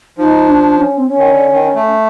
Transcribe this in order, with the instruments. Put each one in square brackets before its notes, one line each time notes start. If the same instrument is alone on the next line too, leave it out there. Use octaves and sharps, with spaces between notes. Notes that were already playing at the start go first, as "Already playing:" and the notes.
[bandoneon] F3 [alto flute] D#4
[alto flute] D4
C#4
C4
C#4
[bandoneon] D#3
D3
D#3
A3